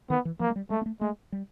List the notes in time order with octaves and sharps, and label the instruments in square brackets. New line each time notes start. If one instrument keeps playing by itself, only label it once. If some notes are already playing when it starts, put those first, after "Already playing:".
[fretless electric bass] D#3 [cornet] B3
[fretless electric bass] E3
[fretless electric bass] F3 [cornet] A#3
[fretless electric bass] G#3
G3
[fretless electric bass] G#3 [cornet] A3
[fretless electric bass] A#3
A3
[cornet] G#3 [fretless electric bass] A3
[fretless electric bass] G3